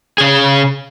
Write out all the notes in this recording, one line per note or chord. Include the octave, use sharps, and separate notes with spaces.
C#3 G#4